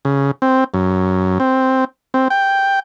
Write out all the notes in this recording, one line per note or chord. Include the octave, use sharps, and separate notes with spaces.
C#3
C4
F#2
C4
C4
G5